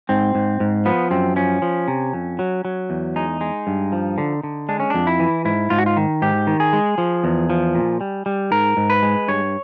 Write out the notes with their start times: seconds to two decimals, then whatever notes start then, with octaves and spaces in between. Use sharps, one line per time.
0.09 G#2 C4
0.35 G#2
0.60 G#2
0.85 F3 B3
1.11 F#2 C4
1.36 F3 C#4
1.62 F3
1.88 C3
2.13 F2
2.39 F#3
2.65 F#3
2.90 E2
3.16 G#3 D#4
3.41 G#3
3.67 G2
3.92 F3
4.18 D3
4.43 D3
4.69 G#3 D4
4.80 C#4
4.90 F2 D4
5.07 E4
5.19 E3
5.45 G#2 E4
5.70 G#2 F4
5.78 F#4
5.86 F4
5.97 D#3
6.22 G#2 G4
6.47 D#3
6.60 G#4
6.73 G#3
6.98 F3
7.24 E2
7.50 F3
7.75 A#2
8.01 G3
8.26 G3
8.51 G#2 A#4
8.77 G#2
8.90 B4
9.03 G#3
9.28 G2 C#5